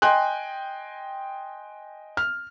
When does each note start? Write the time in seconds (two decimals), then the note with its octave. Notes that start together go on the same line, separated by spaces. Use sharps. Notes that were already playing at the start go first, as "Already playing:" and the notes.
0.02 D#5 G5 G#5 C6 F#6
2.17 F6